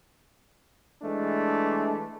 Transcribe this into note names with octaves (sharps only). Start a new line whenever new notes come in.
E3 G#3 A3 D4